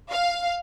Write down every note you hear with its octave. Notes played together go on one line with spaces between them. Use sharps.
F5